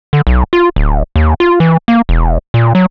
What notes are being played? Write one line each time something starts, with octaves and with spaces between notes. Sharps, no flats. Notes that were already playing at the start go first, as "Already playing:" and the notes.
D3
B1
F4
D1
D#2
F4
E3
A#3
E1
A#2
F#3